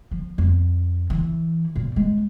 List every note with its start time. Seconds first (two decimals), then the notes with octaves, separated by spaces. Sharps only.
0.11 F3
0.38 F2
1.10 E3
1.76 A#2
1.96 G#3